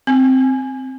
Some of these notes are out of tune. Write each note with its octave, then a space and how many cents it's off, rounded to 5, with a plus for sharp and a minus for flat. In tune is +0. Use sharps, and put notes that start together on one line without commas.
C4 +0